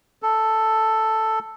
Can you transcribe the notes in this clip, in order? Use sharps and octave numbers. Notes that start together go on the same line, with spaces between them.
A4